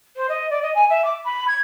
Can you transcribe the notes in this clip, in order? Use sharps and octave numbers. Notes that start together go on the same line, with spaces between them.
C5
D#5
D5
D#5
G#5
E5
D6
B5
G#6